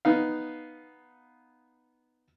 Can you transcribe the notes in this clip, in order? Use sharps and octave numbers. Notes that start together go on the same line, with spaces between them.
B3 D#4 F5